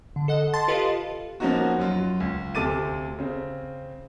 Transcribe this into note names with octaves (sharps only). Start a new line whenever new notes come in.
D3
A4 D#5 F#5
A5 C6 A6
F4 G4 A4 B4 D#5 F5
F3 A#3 B3 C#4 D#4 F#4
F#2 F#3 F4
C#2
D2 C3 A4 D6 A6 D#7
C#3 C4